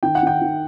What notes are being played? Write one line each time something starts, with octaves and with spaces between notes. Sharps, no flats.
D#3 G5
F#5
D#3 G5
D#3